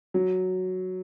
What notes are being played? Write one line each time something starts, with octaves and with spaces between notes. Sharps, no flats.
F#3